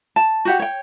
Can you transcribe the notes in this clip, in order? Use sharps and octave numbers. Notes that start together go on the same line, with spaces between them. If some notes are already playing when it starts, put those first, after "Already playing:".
A5
F#4 G4 F#5
C#5 G5